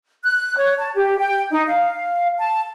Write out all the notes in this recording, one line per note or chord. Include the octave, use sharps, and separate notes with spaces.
F#6
C#5
A5
G4
G5
D#4
F5
A5